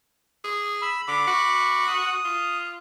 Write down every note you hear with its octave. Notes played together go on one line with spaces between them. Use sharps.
G#4
B5 E6
D3 B5 D6
F#4
D#6
F4